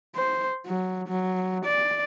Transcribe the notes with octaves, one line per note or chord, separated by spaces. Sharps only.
C5
F#3
F#3
D5